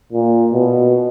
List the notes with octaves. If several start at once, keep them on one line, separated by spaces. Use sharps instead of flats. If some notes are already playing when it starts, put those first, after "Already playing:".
A#2
B2